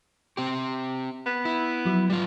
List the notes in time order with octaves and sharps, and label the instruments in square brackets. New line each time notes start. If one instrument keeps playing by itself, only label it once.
[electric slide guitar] C4 G4
[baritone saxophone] B3
[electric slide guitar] E4
[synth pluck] F3 F#3
[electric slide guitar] G3 F4